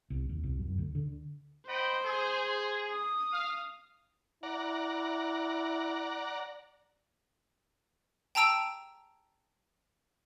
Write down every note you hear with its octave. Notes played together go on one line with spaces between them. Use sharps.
C2
D#2
C2
F#2
D2
D3
C5 D#5 G5 B5
G#4
D#6
F5
E4 D5 F#5 A#5
G5 A5 A#5 E6 D7 F7